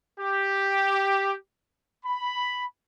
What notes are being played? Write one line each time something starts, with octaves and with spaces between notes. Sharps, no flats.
G4
B5